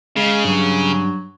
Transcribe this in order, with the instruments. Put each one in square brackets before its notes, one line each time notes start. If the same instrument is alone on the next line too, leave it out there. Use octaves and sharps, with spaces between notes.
[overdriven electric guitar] C#3 [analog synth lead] G#3
[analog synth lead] G2 [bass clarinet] F#3